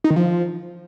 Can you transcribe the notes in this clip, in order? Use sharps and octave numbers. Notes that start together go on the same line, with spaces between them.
D#4
D#3
F3